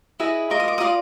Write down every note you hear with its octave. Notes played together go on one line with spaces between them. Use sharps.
E4 G#4 B4 D#5
F4 A#4 D#5 D6
D#6
D6
F4 A#4 D5 D#6